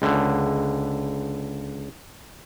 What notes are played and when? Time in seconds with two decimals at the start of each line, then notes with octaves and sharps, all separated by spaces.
0.02 C#2 D3